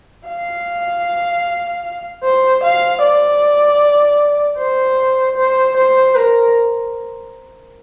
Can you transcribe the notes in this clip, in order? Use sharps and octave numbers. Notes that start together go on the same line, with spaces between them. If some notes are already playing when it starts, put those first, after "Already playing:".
F5
C5
F5
D5
C5
C5
C5
A#4